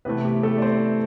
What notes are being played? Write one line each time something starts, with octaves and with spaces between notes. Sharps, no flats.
C3 E3 A3 B3 B4
G4
A3 A4
D5
C4 C5